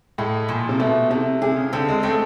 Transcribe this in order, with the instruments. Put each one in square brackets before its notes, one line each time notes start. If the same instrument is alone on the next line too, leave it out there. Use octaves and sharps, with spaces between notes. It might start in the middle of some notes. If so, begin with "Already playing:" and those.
[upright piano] A2 [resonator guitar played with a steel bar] G#3
[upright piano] A#2 [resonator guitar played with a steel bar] F3
[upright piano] C3
[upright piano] B2 [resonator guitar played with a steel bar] A3
[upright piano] C3 [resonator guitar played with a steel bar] A3
[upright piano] C3 [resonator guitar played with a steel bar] G#4
[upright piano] C#3
[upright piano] D3 [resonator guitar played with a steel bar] C4
[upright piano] G#3
[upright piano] A3 [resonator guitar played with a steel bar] C4